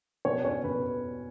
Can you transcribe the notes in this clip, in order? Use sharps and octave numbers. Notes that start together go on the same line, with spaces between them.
B2 C#5
C#4 C#5
B2 B4